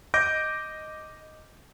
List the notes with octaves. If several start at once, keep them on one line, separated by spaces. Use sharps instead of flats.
D#5 D6 G6 A#6 D7